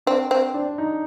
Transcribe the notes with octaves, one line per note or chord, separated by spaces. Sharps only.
C4 D4
C4
D4
D#4